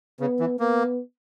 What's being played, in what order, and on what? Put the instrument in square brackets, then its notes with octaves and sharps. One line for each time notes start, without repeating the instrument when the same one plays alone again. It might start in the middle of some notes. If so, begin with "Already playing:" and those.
[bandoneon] C#3 [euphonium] B3
[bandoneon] E3
[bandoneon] A#3 [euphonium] B3